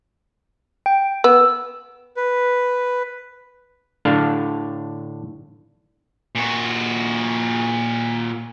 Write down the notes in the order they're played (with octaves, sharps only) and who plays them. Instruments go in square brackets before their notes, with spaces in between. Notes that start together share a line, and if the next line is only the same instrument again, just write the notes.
[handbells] G5
[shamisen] B3 [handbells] E6
[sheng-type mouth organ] B4
[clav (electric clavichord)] A2 D3 D4 F5 A5
[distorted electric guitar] A#2 F#4